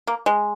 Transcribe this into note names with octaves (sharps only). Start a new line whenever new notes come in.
A#3
G#3